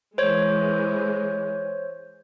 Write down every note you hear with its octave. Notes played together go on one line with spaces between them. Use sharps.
E3 G#3 C5 C#5